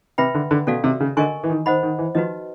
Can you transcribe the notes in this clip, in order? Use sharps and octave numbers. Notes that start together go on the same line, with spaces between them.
C3 B4 E5 G5 B5
D3
D3
B2 C#4 F#4 A4 D5 F5
C3
C#3
D3 A#4 D#5 G#5 C#6
E3
D#3
D#3 C5 D#5 F#5 B5
D#3
E3
F3 D#4 F#4 B4 D#5